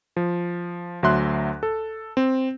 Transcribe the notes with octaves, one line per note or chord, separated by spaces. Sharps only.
F3
D2 F#3 E5 C6 F#6
A4
C4